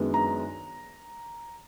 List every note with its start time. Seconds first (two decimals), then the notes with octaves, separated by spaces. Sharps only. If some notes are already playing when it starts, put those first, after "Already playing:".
Already playing: F#2 D#3 G#3 B3 D4
0.14 A#5